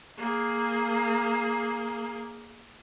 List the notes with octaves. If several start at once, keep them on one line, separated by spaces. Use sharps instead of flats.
A#3 G#4